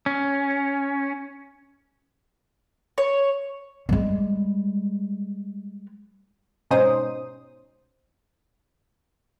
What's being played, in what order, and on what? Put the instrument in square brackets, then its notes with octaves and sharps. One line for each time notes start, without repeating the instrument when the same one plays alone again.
[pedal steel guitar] C#4
[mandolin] C#5
[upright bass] G3 G#3
[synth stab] G#2 B2 C#4 D#4 C5 D#6